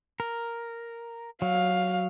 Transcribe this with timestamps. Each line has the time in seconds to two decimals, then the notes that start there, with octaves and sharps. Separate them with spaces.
0.20 A#4
1.42 F#3 F5